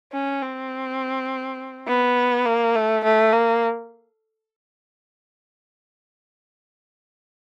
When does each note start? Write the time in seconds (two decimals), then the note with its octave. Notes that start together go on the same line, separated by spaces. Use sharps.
0.13 C#4
0.42 C4
1.88 B3
2.46 A#3
2.76 A3
3.04 A3
3.33 A#3